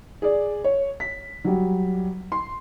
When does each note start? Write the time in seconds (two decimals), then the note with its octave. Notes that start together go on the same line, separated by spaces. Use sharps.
0.22 G#4 D5
0.64 C#5
1.00 B6
1.45 F#3 G3
2.32 C6